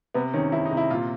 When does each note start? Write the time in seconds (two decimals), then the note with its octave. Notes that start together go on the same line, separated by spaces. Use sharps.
0.14 C3 B3
0.34 D#3 C#4
0.52 D#3 E4
0.65 D#4
0.71 C3
0.77 E4
0.90 A#2 F4